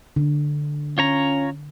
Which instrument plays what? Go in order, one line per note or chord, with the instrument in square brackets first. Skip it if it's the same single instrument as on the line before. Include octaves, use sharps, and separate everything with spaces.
[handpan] D3
[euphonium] C#4 [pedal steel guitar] F4 C#5 A#5